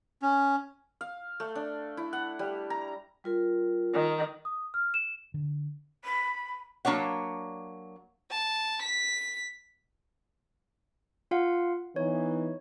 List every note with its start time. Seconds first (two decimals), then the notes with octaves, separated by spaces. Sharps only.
0.22 C#4
1.01 F5
1.40 A3
1.55 D4
1.97 E4
2.13 F#5
2.39 G3
2.70 A#5
3.24 G3 F4 A#4
3.94 D#3
4.45 D#6
4.74 F6
4.94 E7
5.34 D3
6.05 B5
6.85 F#3 A#3 D4 C#5 F#5
8.31 A5
8.83 B6
11.31 F4 F5 F#5
11.96 E3 B3 D#4 C#5